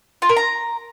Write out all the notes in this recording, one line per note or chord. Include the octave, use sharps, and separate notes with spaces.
F4
A#4
A#5